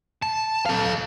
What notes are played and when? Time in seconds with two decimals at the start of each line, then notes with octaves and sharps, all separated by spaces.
0.22 A5
0.66 A4 F5